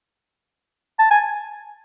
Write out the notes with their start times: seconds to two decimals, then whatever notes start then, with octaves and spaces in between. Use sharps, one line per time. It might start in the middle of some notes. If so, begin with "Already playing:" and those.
0.99 A5
1.11 G#5